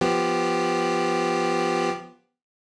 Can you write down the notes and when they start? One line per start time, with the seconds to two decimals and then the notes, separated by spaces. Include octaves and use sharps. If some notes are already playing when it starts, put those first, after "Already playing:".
0.01 F3 B3 G4